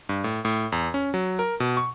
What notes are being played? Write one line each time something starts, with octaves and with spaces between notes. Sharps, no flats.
G2
A2
A2
E2
C#4
F#3
A#4
B2
C#6